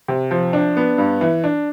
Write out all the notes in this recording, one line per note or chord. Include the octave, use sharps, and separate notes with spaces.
C3
F3
D4
B3
G2
E3
D4